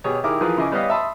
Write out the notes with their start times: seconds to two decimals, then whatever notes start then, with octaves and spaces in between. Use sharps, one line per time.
0.04 B2 G4 G#4 C#5
0.24 D#3 E4 G4 G#4 A#4 D6
0.41 E3 F3 G#4 A#4 B4
0.57 C#3 E4 D#5 G#5 D6
0.71 G3 B3 B4 C#5 D#5 F5
0.90 E5 A5 B5 C6 D#6